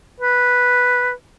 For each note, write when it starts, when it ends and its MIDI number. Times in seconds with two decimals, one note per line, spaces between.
0.20 1.11 71